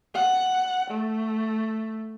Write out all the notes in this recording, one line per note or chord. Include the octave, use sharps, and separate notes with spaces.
F#5
A3